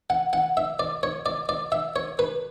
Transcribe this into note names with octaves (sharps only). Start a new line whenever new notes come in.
F#5
F#5
E5
D5
C#5
D5
D5
E5
C#5
B4